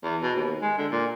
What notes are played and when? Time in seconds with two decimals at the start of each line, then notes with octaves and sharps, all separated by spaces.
0.03 E2
0.22 B2
0.36 D#2
0.61 G#3
0.78 D3
0.91 A#2